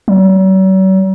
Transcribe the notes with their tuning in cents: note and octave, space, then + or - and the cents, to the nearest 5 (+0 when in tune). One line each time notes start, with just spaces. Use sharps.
F#3 +45